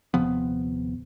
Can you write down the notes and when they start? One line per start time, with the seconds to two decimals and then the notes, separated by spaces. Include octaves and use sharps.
0.14 D#1 C3 F3 B3